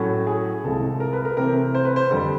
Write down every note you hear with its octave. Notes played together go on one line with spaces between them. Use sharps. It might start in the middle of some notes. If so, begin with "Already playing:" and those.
Already playing: A2 F#3 A3 C#4
G#4
C2 C3 F3 G#3 A4
A#4
B4
A#4
C3 E3 A3 C4 A#4
C5
B4
C5
F2 D3 G3